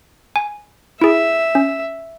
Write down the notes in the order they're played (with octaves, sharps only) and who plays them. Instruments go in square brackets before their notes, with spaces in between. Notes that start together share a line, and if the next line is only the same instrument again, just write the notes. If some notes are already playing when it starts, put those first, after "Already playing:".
[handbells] G#5
[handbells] E4 G#4 [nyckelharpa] E5
[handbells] C#4